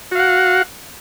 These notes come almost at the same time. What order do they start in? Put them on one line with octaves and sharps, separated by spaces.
F#4 F5 F#5